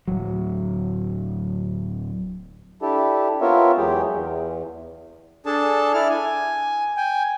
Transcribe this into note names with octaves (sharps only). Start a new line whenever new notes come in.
D1 F#3
D4 E4 G4 A4
B3 C4 F4 A#4 C#5 E5
E2 F#3 G#3 G4 G#4 G5
E2
D4 G#4 A4 A5
E4 D5 F6
G#5
G5 G#5